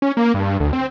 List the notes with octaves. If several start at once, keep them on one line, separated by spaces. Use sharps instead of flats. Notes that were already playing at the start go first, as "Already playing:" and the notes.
C#4
A#3
G2
D2
C4